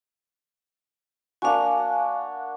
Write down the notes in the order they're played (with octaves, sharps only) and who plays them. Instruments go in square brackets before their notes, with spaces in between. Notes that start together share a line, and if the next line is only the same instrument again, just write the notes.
[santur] A#3 D4 F#4 [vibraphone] F5 G#5